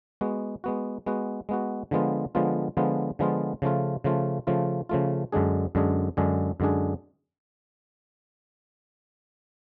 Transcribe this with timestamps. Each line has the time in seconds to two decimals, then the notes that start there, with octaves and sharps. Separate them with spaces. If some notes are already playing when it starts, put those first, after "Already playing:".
0.21 G#3 B3 F#4
0.64 G#3 B3 F#4
1.06 G#3 B3 F#4
1.49 G#3 B3 F#4
1.91 D3 F3 G#3 B3 F4
2.35 D3 F3 G#3 B3 F4
2.77 D3 F3 G#3 B3 F4
3.19 D3 F3 G#3 B3 F4
3.62 C#3 F3 A3 F4
4.04 C#3 F3 A3 F4
4.47 C#3 F3 A3 F4
4.89 C#3 F3 A3 F4
5.32 F#2 D3 G#3 D4 G#4
5.75 F#2 D3 G#3 D4 G#4
6.17 F#2 D3 G#3 D4 G#4
6.60 F#2 D3 G#3 D4 G#4